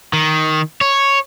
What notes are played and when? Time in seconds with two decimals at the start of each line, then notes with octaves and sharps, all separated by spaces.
0.13 D#3
0.81 C#5